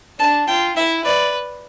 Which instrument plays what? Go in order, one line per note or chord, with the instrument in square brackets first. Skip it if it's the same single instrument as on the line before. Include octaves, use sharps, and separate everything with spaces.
[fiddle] D4 [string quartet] A5
[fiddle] F4 [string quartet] G5
[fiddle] E4 [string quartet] E5
[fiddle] B4 [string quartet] D5